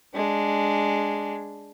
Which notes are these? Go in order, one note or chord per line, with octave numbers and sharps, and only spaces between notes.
G#3 D4